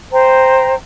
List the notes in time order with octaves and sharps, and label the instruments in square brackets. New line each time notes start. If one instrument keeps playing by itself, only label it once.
[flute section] C5 G5 A#5